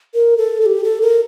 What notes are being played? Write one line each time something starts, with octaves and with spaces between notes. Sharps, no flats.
A#4
A4
A4
G4
A4
A#4